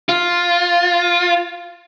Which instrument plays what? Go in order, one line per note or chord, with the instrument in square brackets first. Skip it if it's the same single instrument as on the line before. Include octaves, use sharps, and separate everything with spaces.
[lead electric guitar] F4